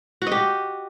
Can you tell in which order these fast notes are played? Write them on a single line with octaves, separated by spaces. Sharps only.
F#4 D#5 G4